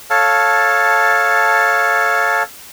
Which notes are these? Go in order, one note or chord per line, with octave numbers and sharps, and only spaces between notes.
A4 C#5 F5 A5